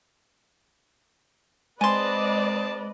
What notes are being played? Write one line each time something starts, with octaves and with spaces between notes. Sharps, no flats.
G#3 C4 B4 D5 D#5 G#5 A5 C6